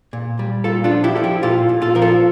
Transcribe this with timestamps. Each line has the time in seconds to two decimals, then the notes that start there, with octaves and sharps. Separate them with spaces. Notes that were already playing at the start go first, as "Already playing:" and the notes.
0.13 A#2
0.39 G3
0.64 A#2 F4 A4
0.84 D4 F4
0.91 F3
1.04 E4 G4
1.16 F3 A4
1.24 E4 G4
1.43 A#2 F4 A4
1.69 A#2
1.82 F4 A4
1.95 F3 A#4
2.02 F4 A4